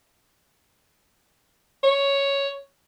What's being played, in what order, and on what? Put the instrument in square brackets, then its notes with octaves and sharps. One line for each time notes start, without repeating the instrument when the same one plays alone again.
[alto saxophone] C#5